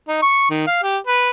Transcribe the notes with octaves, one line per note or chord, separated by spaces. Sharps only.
D#4
C#6
D#3
F5
G4
B4